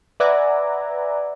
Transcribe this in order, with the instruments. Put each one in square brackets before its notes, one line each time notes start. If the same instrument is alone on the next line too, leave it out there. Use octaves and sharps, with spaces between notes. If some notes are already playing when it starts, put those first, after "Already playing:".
[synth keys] B4 D5 E5 F#5 G#5 A#5